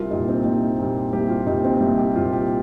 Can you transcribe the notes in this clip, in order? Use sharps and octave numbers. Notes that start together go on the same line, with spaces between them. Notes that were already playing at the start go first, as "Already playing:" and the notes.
Already playing: C2 F4 A#4
A#2 G3 D#4
C4
C2 D#4
A#2 G3
C2 G4
F4
A#2 G3 D#4
C4
C2 D#4
G4
A#2 G3 F4
G4